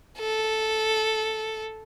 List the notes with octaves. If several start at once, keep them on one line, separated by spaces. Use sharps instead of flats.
A4